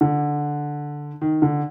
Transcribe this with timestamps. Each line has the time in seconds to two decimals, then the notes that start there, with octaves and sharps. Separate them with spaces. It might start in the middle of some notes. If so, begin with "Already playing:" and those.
0.01 D3
1.21 D#3
1.42 D3